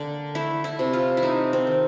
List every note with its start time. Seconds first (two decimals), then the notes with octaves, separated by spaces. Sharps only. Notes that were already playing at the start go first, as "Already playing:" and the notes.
Already playing: D3 A#3
0.35 A3 E4
0.64 E4
0.79 C3
0.93 F4
1.17 E4
1.22 A3 D#4
1.53 C4
1.67 D#3